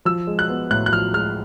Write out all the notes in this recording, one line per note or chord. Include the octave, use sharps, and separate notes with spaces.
F3 E6
G#3
F#6
B3
A2 F#6
F#6
F3 F6
G#3 F6